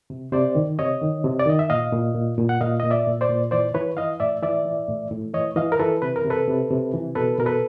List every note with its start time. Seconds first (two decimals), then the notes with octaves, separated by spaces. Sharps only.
0.10 C3
0.32 C3 C5 D5
0.55 D#3
0.79 C3 C#5 D#5
1.02 D#3
1.24 C3
1.39 D5
1.46 D#3 D#5
1.59 E5
1.70 A#2 D#5 F5
1.92 A#2
2.15 A#2
2.38 A#2
2.49 F#5
2.61 A#2 D#5 F5
2.80 A#2 D#5
2.90 D5 E5
3.07 A#2
3.21 C5 D5
3.30 A#2
3.51 E3 C5 D5
3.74 E3 B4 C#5
3.97 E3 D#5 F5
4.20 A2 D5 E5
4.42 E3 D5 E5
4.65 E3
4.89 A2
5.11 A2
5.34 E3 C#5 D#5
5.56 E3 D#5 F5
5.72 A#4
5.80 E3 A4 B4
6.02 C3 B4
6.16 A#4
6.25 C3
6.30 A4 B4
6.48 C3
6.71 C3
6.94 E3
7.15 B2 A4 B4
7.38 B2 A#4
7.46 A4 B4